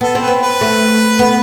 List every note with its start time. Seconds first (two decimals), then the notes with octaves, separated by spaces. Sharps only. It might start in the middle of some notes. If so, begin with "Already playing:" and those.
0.01 B3 A4
0.15 C4
0.21 B4
0.28 B3
0.41 B4
0.61 A3
1.19 B3